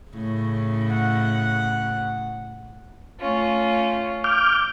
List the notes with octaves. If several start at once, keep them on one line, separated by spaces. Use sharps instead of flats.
A2 C#3
F#5
A3 C#4 F4
D6 F6 G6